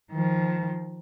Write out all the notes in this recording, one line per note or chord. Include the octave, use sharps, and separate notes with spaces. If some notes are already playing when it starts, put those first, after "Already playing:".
D#3 F3